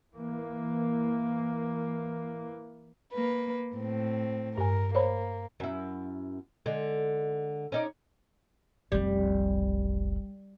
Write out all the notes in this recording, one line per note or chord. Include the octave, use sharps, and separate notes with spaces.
E3 A#3
A#3 B4
A2 C4
G2 A#4 G#5
A#3 C5 C#5 B5
F#2 E4
D3 G#3
C#4 D#4 D5
F1 B1 G3